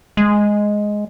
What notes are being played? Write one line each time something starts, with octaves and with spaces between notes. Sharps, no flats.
G#3